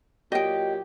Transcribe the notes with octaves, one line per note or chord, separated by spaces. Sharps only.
A#2 F#3 G4 D#5 G5